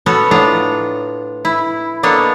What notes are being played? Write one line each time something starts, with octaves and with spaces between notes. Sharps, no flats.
B3 C#4 F#4 A4 C#5
A2 B3 D4 F4 A#5
E4
A#3 B3 D4 A4 C#5 D#5